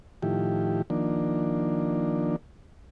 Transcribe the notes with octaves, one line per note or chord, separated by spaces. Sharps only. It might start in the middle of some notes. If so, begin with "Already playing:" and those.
A2 D#3 F3 E4 G4
D#3 F3 A#3 D4